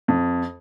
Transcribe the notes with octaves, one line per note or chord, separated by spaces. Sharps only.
F2